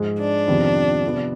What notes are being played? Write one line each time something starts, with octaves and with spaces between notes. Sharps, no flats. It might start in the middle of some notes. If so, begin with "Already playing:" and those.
Already playing: G#2 F3 G#3
D4
F2 C3 D#3 B3
C3 F3 B3